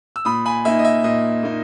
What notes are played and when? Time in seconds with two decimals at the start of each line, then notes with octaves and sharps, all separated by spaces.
0.16 E6
0.25 A#2 B5 D#6
0.46 G#5 B5
0.65 A#3 D#4 E5 G#5
0.79 D#5
0.85 E5
1.04 A#2 D#5
1.43 A#3 D#4